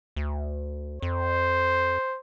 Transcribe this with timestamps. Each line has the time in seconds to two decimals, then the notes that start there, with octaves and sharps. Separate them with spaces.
0.16 D2
1.02 F2 C5